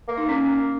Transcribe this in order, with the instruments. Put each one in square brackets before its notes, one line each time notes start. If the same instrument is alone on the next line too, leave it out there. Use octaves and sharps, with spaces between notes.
[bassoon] A#3
[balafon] D#4
C#4